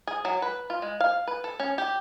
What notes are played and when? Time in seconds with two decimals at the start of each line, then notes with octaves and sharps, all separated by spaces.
0.07 G#4
0.25 F#3
0.42 B4
0.70 F4
0.82 G#3
1.00 F5
1.27 B4
1.44 A4
1.60 C#4
1.78 G4